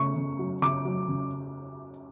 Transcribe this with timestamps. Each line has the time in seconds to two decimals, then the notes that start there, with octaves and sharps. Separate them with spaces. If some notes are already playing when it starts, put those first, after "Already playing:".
Already playing: C#3 A3 C#6
0.16 C#3
0.39 F#3
0.62 C#3 D6
0.85 F#3
1.08 C#3